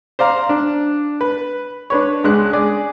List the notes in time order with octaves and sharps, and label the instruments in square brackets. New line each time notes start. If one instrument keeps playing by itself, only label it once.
[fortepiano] C5 D5 F5 A#5
D4
B4
D4 B4 C#5
C#2 G#3 D4 F#6
G#4 D5